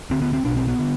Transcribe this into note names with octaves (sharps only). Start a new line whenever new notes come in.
D2 D3 C4
B3
C4
B1 B2 D4
C4
B3
D3